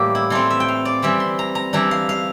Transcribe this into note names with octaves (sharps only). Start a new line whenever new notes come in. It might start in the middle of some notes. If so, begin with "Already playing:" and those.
Already playing: A2 E3 G3 A#3 G4
E4
E3 A3 C4 F4
E5
G5
F5
D5
E3 G3 C4 E5
C6
A#5
A#5
E3 G3 D4 A#5
F5
F5